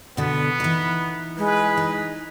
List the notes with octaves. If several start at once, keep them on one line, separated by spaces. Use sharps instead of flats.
B2 D3 B3
E3 D#4
G#3 B4
D#4